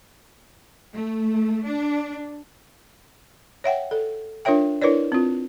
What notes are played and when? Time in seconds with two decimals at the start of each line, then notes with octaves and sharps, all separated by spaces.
0.93 A3
1.66 D4
3.64 C#5 E5 F#5 G5
3.91 A4
4.45 D4 F4 A#4 C#5 E5 G5
4.82 D4 E4 A#4 B4 C#5 D5
5.12 C4 F4